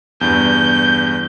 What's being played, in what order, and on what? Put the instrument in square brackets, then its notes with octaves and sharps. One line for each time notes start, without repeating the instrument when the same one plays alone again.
[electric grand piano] E2 G2 [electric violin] G6